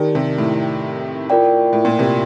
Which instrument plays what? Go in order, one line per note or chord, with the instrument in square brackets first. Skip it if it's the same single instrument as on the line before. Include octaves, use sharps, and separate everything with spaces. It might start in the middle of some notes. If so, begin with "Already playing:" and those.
Already playing: [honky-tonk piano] D#3 [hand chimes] G4 A#4 D5 A5
[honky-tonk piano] C3
A2
[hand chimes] F4 A#4 D5 G5
[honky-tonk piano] A2
A#2
C3